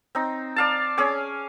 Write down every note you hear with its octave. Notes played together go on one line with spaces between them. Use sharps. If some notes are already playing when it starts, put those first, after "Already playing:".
C4 D#4
D5 F5 A5
C#4 G#4 G#5 D6